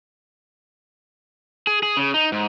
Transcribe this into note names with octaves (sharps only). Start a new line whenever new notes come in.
G#4
G#4
C#3
D#4
G#2